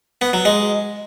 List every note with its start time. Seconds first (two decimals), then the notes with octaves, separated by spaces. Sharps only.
0.21 B3
0.33 F#3
0.45 G#3